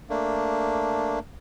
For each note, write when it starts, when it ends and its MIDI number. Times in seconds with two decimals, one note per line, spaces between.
0.10 1.19 57
0.10 1.19 58
0.10 1.19 62